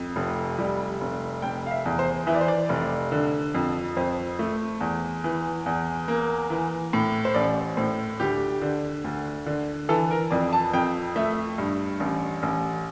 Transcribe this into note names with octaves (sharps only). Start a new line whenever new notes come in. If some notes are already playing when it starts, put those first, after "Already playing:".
Already playing: F2
F1
G3
F1
F1 G5
F5
E5
E2
C5
E3 E5
D5
C5
D5
F1
D3
F2
F2 C5
A3
E2
E3
E2
A#3
E3
A2
C5
A1 D5
A2 C5
D2 G4
D3
D2
D3
E3 A4
A#4
F2 D5
A5
F2 G5
A3 E5
G2
A1
A1